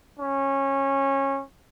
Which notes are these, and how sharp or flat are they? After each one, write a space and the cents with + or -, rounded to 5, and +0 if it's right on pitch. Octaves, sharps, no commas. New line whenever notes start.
C#4 -20